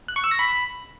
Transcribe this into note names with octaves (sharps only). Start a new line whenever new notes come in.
F#6
C#6
E6
A#6
B5